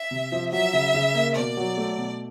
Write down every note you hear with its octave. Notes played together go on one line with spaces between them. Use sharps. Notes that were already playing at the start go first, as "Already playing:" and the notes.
Already playing: E5
C3
F3
F#3 E5
C#3
C#3
A#3
B2 D5
F#3
A3
B2